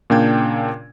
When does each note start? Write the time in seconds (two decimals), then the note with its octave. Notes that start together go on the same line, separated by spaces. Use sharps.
0.10 A#2 C#3 A#3 D4 G5 G#6